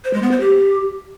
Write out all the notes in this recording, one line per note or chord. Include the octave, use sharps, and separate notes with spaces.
C5
G#3
B3
C5
G4